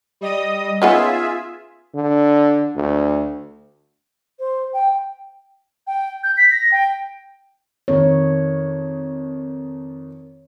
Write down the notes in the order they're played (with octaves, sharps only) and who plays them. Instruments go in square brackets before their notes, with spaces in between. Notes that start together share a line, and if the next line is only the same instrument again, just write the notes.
[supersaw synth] G3 D#5 D#6
[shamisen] B3 C#4 D#4 [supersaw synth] F4 G#4 E5
[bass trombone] D3
D2
[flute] C5
G5
[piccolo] G5
G6
B6
A#6
G5
[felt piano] F2 D#3 [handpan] C#5